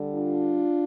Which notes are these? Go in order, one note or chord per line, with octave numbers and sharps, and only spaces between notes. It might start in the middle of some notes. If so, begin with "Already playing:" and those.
Already playing: D3 G3
D4 F4